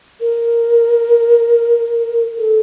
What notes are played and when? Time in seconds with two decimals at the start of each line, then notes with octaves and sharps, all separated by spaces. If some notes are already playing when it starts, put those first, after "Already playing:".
0.21 A#4
2.39 A4